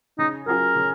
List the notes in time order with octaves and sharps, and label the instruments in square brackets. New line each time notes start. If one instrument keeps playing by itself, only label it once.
[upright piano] C#3 [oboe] D#4
[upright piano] F#3 C#4 F4 G#4 [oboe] A#4
[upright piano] C#3